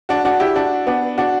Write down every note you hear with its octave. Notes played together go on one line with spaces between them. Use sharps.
D4 F#4
D4 F#4
E4 G4
D4 F#4
B3 D4
D4 F#4